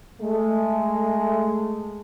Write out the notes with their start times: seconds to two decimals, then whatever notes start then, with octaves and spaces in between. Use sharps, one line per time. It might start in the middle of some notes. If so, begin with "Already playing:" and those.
0.21 G#3 A3